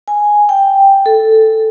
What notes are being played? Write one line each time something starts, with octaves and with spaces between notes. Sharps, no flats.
G#5
G5
A4